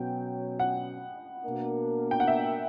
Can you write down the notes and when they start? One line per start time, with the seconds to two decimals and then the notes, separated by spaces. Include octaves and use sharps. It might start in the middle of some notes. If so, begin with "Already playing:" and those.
Already playing: B2 F#3 C#4 G5
0.60 F#5
1.44 B2 A#3 D4 A#4
2.11 G5
2.20 F#5
2.27 E5